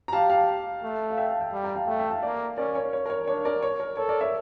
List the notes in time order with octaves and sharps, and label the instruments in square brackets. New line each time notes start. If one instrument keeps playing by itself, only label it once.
[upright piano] A#5
[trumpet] G4 [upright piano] F5 A5
[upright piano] F5 A5
[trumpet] A3
[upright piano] F5
E5 G5
F5 A5
E5 G5
[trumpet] G3
[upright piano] G5 A#5
F5 A5
[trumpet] A3 [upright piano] E5 G5
[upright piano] E5 G5
F5 A5
[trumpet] A#3 [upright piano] D5 F5
[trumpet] C#4 [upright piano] A#4 D5
[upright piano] C#5
C#5
A#4
C#5
[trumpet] D4 [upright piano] C#5
[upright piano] A#4 D5
C#5
A#4
[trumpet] A4 [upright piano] C#5
[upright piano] A#4 D5
C#5 E5